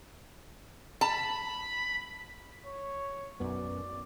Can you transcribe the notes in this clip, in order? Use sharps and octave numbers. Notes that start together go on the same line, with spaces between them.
A5 B5
C#5
B1 F#2 B3 D5